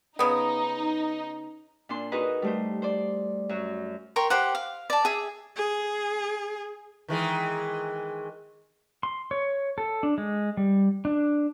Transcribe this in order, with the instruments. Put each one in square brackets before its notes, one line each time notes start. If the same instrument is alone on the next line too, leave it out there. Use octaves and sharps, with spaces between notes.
[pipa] C#3 B3 [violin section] D#4
[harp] A#2 D4 C6
D#4 F#4 G#4 A#4 B4 D#5
G3 A3 C5
C5 D5
F#2 F#4
[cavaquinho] A#4 C#5 G5 C6
G4 C5 F#5
F5
D5 A5
G#4 E5
[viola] G#4
[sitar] D#3 E3 G#3
[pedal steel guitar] C6
C#5
A4
D4
G#3
G3
D4